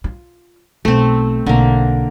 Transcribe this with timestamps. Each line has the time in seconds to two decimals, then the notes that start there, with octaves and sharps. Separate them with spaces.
0.04 F4
0.85 B1 A3 C4
1.46 B1 D3 A#3